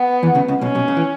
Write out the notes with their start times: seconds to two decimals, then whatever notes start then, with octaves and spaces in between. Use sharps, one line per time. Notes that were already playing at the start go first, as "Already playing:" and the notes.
Already playing: B3
0.22 E2 E3
0.35 C#2 C#3
0.48 C#2 C#3
0.61 B1 B2 C#4
0.75 B1 B2
0.88 C#2 C#3
0.97 E3